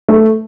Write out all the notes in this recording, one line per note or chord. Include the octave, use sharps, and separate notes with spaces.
A3